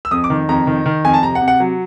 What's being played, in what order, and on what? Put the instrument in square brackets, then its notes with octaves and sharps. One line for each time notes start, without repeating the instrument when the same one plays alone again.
[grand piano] E6
F2 D#6
D6
D#3
F2 A#5
D#3
D#3
F2 G#5
A5
C3 A#5
F#5
C3
F#5
F#3